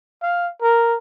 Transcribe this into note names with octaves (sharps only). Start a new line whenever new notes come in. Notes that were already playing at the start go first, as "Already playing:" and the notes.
F5
A#4